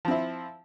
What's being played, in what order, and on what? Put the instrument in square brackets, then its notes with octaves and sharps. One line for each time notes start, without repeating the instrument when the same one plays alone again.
[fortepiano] F3
C4
E4